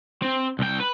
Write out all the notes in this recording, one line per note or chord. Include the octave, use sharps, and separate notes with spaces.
C4
C2 G5
B4